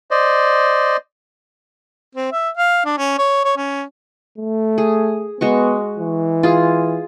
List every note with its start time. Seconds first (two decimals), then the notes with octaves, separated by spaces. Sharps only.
0.11 C5 D5 D#5
2.15 C4
2.32 E5
2.57 F5
2.85 D4
2.98 C#4
3.18 C#5
3.44 C#5
3.57 C#4
4.38 A3
4.78 G#4
5.41 G#3 B3 F#4 C#6
5.99 E3
6.43 F4 G#4